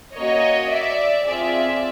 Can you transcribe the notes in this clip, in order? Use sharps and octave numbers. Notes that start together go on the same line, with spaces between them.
A#3 C#4 F#4 C#5 D#5
D5 E5
C4 F4 G#4 D5 E5